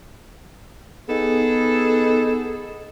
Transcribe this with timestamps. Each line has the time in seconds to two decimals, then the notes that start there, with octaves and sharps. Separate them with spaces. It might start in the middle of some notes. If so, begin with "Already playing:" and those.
1.09 B3 D#4 G#4 A4